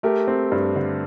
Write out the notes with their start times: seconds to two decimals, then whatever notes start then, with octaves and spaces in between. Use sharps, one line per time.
0.03 A3 G4 A#4
0.28 C4
0.52 G2
0.75 D3